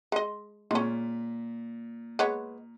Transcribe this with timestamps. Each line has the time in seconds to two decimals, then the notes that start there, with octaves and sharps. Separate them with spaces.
0.12 G#3 D#5
0.71 A#2 G#3 C#4
2.19 G#3 B3 C#5